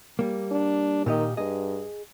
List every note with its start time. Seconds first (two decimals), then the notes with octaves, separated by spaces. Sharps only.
0.19 G3 A#3
0.52 D4
1.06 A#2 D#3 G4 D#5
1.37 G2 G#4 D#5